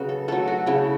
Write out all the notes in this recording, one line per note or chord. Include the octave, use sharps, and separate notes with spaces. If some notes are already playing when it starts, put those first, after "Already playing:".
Already playing: C#3 F#3 F#4 B4
A4
F#3 A3 A4
F#4
C#3 E4